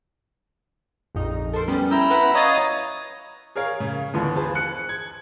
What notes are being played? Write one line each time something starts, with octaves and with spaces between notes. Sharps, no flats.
A#1 F2 D#4
A4 A#4 C5
G3 B3 C#4
E4 G5 A#5 E6
B4 F#5
C#5 D#5 F5 A#5 D#6 A6 D#7
G#4 A#4 C#5 F5
C#3
D#2 D3 E3 F3 B3
G#4 B4 C5 A5
F#6 C#7
G#6